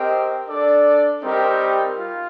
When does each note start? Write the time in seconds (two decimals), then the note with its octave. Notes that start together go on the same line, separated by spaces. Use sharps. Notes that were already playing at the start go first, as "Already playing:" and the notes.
Already playing: C4 G4 A#4 D#5 G5
0.47 D4 A4 D5
1.23 G3 C4 D#4 G4 A#4
1.99 F4